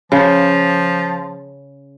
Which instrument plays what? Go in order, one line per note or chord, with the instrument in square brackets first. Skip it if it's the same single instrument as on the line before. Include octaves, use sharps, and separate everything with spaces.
[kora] C#3 [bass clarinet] F3